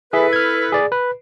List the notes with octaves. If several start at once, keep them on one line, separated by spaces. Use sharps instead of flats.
E4 G#4 A4 B4 E5
F6 G#6
G#4 D5
B4